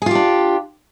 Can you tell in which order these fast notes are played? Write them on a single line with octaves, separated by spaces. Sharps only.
G#4 F4 G4 D4